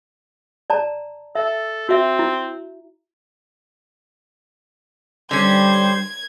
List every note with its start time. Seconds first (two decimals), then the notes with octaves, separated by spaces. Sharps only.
0.70 D5 A5 A#5
1.35 A4 E5
1.89 C4 F#4 E5
2.19 E4
5.31 D3 G3 C#4 C5 G#6